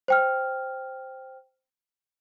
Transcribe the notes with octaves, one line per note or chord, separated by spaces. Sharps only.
C5 G5 F6